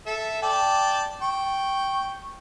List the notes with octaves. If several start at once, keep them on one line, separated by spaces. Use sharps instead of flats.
A4 E5
D5 G5 A5
G5 C#6